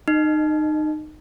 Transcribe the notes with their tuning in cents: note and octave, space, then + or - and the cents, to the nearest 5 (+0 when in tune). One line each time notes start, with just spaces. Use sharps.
D#4 -25 D#5 +0